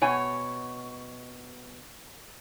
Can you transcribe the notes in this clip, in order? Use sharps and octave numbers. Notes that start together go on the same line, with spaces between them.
B2 C#5 G#5